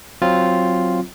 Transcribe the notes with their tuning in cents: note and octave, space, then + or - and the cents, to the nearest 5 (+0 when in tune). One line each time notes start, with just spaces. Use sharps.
F#3 +0 C4 +0 F4 +0